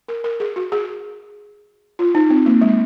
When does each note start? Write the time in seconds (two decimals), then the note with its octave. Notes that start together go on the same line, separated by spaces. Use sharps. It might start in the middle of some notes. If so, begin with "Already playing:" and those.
0.08 A#4
0.24 A#4
0.40 G#4
0.56 F#4
0.72 G#4
1.99 F4
2.15 D#4
2.30 C4
2.46 A#3
2.62 G#3